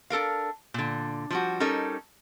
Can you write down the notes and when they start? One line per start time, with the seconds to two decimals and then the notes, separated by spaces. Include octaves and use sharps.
0.10 D4 A4 A#4 F5
0.74 A#2 D3
1.30 F3 G3 F#4
1.60 G3 C#4 D#4 A4 A#4